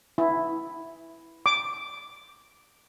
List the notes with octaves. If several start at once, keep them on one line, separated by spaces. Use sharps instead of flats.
E4
D6